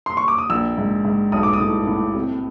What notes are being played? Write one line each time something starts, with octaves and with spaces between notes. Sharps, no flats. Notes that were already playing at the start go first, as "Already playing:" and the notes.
C6
C#6
D6
D#6
A#1 E6
G#2
G#2
B1 D#6
D6
D#6
A2
A2
C3